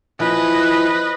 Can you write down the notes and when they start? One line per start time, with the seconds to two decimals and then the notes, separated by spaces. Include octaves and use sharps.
0.20 E3 F3 E4 B4 D#5